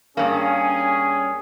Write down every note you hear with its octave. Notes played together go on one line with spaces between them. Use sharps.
G2 A#3 C#4 G#4